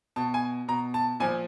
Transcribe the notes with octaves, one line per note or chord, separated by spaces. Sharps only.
B2 A5
G#5
B2 A#5
A5
A#2 F3 G#5